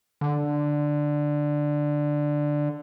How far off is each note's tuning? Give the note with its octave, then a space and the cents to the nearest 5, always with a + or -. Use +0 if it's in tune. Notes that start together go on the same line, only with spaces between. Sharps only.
D3 +5